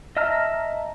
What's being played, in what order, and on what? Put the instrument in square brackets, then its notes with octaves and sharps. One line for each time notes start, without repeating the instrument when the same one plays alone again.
[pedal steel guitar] D#5 E5 A5 A#5 F6